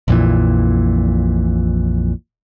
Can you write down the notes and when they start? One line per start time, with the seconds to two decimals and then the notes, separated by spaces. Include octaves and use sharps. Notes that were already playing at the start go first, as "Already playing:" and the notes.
0.08 A#1 F2 A#2 E3